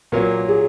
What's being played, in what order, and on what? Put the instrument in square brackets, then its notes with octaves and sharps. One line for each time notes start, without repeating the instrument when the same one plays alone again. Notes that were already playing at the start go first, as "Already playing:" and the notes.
[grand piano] A#2 F#3 A#3 [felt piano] A#4
[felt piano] G#4